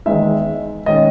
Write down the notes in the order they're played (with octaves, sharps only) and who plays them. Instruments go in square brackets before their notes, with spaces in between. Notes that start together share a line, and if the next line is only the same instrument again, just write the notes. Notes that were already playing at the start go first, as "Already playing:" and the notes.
[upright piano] E2 D#3 G#3 D#4 E5
D#3 G#3 C#4 D#5